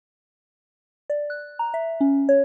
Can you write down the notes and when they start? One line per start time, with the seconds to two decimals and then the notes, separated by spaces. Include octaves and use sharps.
1.10 D5
1.30 F#6
1.59 A#5
1.74 E5
2.01 C#4
2.29 C#5